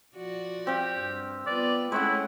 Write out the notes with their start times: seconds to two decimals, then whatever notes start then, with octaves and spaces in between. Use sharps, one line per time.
0.16 F3 F#4 D5
0.67 C4 G4 F5
0.99 G2
1.47 B3 F4 B4 D5
1.92 G#3 A3 C4 C#4 E4 C#5 F#5